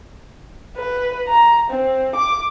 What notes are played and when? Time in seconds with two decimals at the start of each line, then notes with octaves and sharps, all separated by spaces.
0.77 B4
1.27 A#5
1.70 C4
2.15 D6